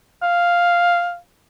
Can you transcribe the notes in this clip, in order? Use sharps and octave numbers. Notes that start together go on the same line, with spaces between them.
F5